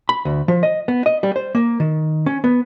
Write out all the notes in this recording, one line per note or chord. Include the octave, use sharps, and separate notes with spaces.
B5
D2
F3
D#5
B3
D#5
G3
C5
A#3
D#3
C#4
B3